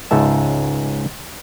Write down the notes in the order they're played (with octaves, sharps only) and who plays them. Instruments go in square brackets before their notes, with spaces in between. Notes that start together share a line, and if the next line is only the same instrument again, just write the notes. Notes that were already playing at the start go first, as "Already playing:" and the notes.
[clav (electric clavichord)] C#2 G#2 E5 A5